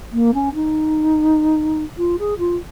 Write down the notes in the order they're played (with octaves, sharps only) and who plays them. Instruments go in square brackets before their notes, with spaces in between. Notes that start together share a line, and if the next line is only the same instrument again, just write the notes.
[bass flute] A#3
C#4
D#4
F4
G#4
F4